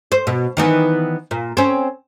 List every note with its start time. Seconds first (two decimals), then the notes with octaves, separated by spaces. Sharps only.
0.12 C5
0.27 B2
0.57 D#3 E3 B3
1.31 A#2
1.57 C4 C#4